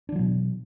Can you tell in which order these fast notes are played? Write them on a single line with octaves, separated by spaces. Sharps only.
D4 E3 F#3 B2